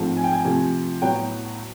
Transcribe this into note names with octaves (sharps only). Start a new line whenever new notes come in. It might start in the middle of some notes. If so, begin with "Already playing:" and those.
Already playing: G#2 F3 A3 C4
G#5
G5
G#5
C3 F3 A3 G#5
A2 F#3 B3 G5